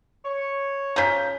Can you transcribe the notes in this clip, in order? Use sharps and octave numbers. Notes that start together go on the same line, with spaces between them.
C#5
C#3 F3 A#5 G6 B6